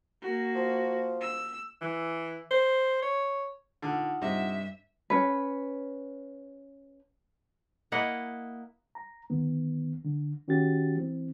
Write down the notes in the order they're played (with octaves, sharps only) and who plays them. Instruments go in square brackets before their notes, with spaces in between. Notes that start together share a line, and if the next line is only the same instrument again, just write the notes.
[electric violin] A#3 F#4
[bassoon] F3
[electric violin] E6
[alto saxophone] E3
C5
C#5
[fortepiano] D3 [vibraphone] D#4 F4 F#5
[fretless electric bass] G2 [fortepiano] C3 D#5 [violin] E5
[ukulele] C#4 B4
[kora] A#3 E4 D#5 F#5
[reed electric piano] A#5
D2 D#3 B3
D3
D#3 C#4 F#4 G4 A6
E3 C4